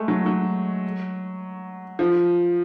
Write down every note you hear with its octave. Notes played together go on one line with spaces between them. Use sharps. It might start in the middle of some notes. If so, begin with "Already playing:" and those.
Already playing: G#3 A3
F#3
F#3
F3